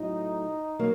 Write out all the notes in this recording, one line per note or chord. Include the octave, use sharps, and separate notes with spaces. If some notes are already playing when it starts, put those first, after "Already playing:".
Already playing: A2 F#3 A3 D#4
F#3 A#3